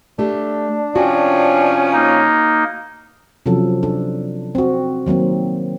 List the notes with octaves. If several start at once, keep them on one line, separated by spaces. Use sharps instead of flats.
A3 D4 G4 A4
C3 F3 C#4 F#4 G5
A#3 D#4
C3 F3 F#3 C#4 A4
D4 A4
C4 F#4
D#3 F#3 A#3 C4